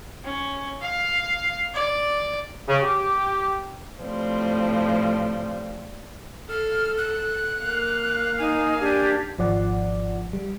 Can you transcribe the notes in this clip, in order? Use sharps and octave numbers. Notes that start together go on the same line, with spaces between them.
C#4
F5
D5
C#3
G4
A2 F3 G3 C4
A4 F6
F#6
A#3 F5
D#4 G#5
D4 G4 G#6
G#1 F3 D5 F#5
G3